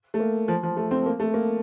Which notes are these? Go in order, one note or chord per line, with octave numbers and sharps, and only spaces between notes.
A3
A#3
F3
F3
A3
C4
A#3
A3
A#3